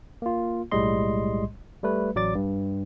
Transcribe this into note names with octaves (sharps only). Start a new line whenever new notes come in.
A#3 F4
B1 A2 G3 G#3 D#5 C6
G3 A3 B4
A1 F#3 D5 D6 A6
G2